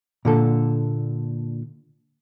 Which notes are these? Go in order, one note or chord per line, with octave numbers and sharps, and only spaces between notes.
A#2 D3 A4